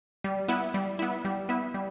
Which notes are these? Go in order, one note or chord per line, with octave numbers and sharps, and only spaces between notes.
G3
B3 E4
G3
B3 E4
G3
B3 E4
G3